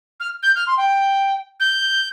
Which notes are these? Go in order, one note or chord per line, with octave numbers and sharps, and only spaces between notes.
F6
G6
F6
C6
G5
G6